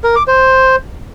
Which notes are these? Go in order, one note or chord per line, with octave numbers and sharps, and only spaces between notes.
A#4
D6
C5